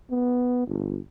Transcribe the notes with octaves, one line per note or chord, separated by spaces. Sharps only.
B3
G1